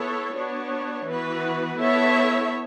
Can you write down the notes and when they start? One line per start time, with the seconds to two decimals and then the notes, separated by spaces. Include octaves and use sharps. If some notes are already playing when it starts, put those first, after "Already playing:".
Already playing: B3 E4 A4 C#5
0.34 B3 D4 F#4 C#5
1.07 E3 B3 F#4 B4
1.78 B3 E4 A4 C#5 E5